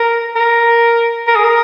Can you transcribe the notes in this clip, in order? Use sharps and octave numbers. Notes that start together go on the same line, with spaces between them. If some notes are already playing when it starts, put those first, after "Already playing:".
Already playing: A#4
A#4
A#4
G#4
A#4